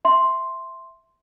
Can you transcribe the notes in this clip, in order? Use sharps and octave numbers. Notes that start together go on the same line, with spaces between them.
E5 C6